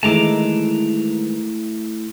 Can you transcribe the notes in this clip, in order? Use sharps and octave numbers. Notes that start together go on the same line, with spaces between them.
D#3 E3 G#3 A3 E4 A5 A#5 D6